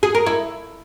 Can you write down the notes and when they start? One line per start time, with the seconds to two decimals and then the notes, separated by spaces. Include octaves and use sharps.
0.03 G#4
0.15 A#4
0.26 E4